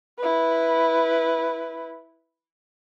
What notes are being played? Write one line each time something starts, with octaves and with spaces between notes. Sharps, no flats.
E4 B4